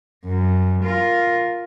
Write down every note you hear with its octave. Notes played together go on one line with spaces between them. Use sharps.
F#2
F4 A#4